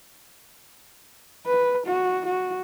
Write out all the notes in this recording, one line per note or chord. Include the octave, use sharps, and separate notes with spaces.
B4
F#4
F#4